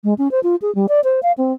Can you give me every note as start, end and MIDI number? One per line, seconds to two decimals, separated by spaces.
0.04 0.14 56
0.18 0.31 61
0.31 0.40 72
0.43 0.56 65
0.62 0.73 68
0.75 0.87 55
0.89 1.00 74
1.04 1.20 72
1.23 1.32 77
1.38 1.53 60